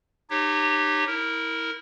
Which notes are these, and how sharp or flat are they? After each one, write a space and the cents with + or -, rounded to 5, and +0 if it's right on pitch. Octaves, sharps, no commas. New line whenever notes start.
D#4 -35 G4 +0 C#5 -25
E4 -25 A#4 -5